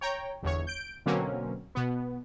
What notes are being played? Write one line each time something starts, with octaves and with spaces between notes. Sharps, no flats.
C#5 G5 A#5
G1 E2 C#5
G6 D7
B2 D3 F#3 A#3 C4 C#4
B2 B3